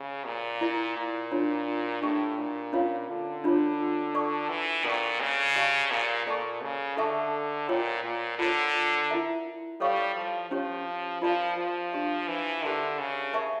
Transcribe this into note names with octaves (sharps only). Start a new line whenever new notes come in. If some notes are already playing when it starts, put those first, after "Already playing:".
Already playing: C#3
A#2
E4 A#4 D5
A#2
D4 F4 C#5
A2 D4 G4 D5 G5 C#6
A#2
C#4 F4 C#5 F5
D3
D4 F4 C#5
A4 D5 A5 C#6
E3
A#2 A4 D5 G5 A#5 C#6
C#3
G4 D5 F5 A5 C#6
A#2
A#2 A4 D5 A5 C#6
C#3
D3 A4 E5 A5 C#6
A#2 F4 A#4 C#5 G5
A#2
D3 F4 A#4 C#5
E4 A#4 E5 A#5
G3 A4 C#5 F5 C#6
F3
F3 C#4 G4 C#5
F3 F4 A#4 D5 F5 A5
F3
D4 G4 D5 F5
E3
D3 G4 A#4 E5
C#3
A#4 E5 A5 C#6